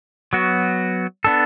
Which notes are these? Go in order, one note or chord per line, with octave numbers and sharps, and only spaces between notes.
F#3 B3 F#4
B3 D4 A4